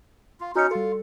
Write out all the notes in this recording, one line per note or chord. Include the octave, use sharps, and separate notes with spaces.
F4
C#4 D#4 F#4 C#7
G3 F4 A4